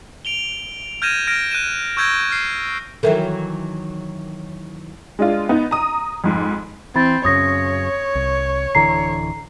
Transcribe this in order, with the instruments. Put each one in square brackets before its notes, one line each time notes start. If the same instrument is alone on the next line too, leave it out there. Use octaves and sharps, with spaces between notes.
[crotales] D7 F7 G7
F6 G6 G#6 A#6 D#7 E7
F6 G6 A#6 D7
F#6 D#7 E7
C#6 E6 G6 G#6 A#6 D7
F6 C7
[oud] D#3 E3 F#3 [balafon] A4 A#4 E5
[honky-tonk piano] G#3 D4 F4
B3 D#4
A#5 D#6
F2 G#2
[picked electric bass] E3 [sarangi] C4 [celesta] B5 A6
[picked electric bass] F#2 C#3 [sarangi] C#5 [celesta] D#6 A#6
[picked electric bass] C2
[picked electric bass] D1 D3 E3 [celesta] A#5 C7